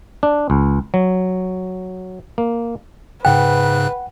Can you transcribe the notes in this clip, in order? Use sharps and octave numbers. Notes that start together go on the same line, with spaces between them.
D4
C#2
F#3
A#3
G#2 C#3 B4 F#5 G5 F#6